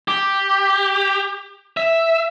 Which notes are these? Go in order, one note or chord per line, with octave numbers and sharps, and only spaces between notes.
G4
E5